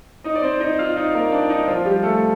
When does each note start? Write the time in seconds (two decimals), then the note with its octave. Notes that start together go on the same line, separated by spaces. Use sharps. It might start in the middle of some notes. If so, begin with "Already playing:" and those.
0.24 D#4 D#5
0.35 D5
0.42 C4 C5
0.60 D#4 D#5
0.79 F4 F5
0.96 D#4 D#5
1.14 A#3 A#4
1.32 D4 D5
1.49 D#4 D#5
1.67 F3 F4
1.85 G3 G4
2.03 A3 A4